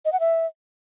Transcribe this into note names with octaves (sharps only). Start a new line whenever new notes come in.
D#5
F#5
E5